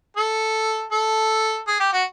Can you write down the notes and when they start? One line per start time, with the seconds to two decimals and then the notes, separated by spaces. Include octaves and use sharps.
0.17 A4
0.92 A4
1.67 G#4
1.80 G4
1.93 F#4